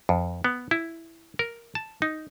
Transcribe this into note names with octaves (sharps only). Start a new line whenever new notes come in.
F2
B3
E4
A#4
A5
D#4